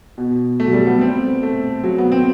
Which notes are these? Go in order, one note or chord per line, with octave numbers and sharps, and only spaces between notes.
B2
A3
F#3
G3
B3
C4
A3
F#3
B3
C4